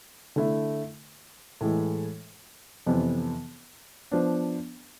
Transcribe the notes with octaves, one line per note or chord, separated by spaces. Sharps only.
D3 A3 E4
A2 E3 G#3
F2 C3 E3 B3
F3 B3 D4